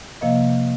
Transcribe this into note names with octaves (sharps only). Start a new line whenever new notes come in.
C3 F3 A#3 D#5 F5